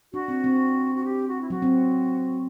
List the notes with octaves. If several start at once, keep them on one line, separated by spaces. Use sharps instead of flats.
D4 F#4
C4
C4
F#4
G4
F#4
E4
F#3 F#4
C4